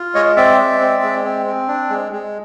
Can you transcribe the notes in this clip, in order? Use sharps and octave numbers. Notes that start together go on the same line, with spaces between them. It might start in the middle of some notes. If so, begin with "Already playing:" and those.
Already playing: F4
G#3 C#5 D#5
C4 D5 E5
G#3
C4
G#3
C4
C4
D4
G#3
G#3